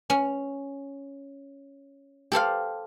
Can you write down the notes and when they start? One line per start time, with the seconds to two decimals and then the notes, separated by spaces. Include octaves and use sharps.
0.10 C#4
2.32 G4 A4 C5 F5